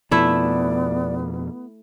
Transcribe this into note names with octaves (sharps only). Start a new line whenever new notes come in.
F2 B2 F3 A3 B3 E4 D5 E5